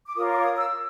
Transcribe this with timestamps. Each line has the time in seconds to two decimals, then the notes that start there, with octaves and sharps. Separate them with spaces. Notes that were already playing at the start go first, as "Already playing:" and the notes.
0.06 D6
0.16 F4 A#4 C#5 D#6
0.29 D6
0.43 D#6
0.57 E6